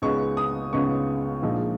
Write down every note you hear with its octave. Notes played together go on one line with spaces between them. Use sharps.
C#2 C#3 G#3 B3 D#4 C#6
D#6
C#2 C#3 G#3 B3 D#4 C#6
A#1 A#2 F3 G#3 D#4